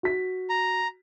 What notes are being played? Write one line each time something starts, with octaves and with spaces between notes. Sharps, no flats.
F#4 B6
A#5